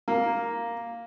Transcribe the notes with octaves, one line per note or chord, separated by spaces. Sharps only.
A#3